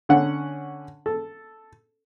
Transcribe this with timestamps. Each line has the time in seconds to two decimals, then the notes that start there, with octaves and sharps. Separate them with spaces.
0.09 D3 C#4 F#5
1.06 A4